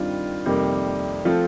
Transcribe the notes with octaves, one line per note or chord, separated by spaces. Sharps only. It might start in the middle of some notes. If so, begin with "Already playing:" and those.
Already playing: G2 D#3 G3 C4 F4
F2 C3 D#3 G3 A#3
F3 A3 C4 F4 A4